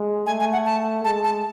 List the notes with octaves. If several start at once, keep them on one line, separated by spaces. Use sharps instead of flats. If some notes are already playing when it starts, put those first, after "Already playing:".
Already playing: G#3
A3 G#5
G#5
F#5
A5
G#3 A5
A5